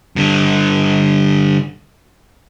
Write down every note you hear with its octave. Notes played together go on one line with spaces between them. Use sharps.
G2 D3